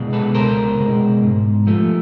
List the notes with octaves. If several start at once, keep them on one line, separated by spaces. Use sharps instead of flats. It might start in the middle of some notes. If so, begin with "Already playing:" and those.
Already playing: B2 G#3
A4 B4
C#2 A#4 C5
B2 G#3
G#2
F3 A3